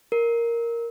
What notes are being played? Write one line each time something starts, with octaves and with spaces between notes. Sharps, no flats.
A#4